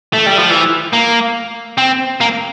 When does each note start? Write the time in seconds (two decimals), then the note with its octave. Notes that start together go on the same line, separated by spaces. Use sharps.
0.13 A3
0.26 G3
0.38 F3
0.50 E3
0.93 A#3
1.78 C4
2.21 A#3